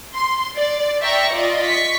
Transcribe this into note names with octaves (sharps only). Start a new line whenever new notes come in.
C6
D5
D5 E5 G5 A#5 C#6
F4 D5 D#5
C#6 B6